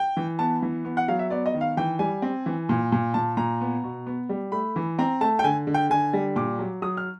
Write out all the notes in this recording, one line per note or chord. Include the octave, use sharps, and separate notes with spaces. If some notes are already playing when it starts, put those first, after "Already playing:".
Already playing: G5
E3
B3 A5
E3
B3
F#5
F#3 F5
E5
B3 D5
D#5
D#3
F5
E3 G5
G3 G#5
C4
E3
A#2
A#2
A#2 A5
A#2 A#5
B3
B2
B3
G3
A3 B5
E3
C4 A#5
A3 A5
G5
D3 G#5
D3
G5
D3 G#5
G3
A#2 D6
F#3
F#3 D#6
F6